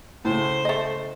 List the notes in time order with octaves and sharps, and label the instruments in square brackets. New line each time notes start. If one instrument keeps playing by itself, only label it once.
[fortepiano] A2 [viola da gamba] C#3 C5
[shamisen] A3 D#5